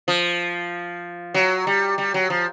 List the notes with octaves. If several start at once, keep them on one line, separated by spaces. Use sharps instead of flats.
F3
F#3
G3
G3
F#3
F3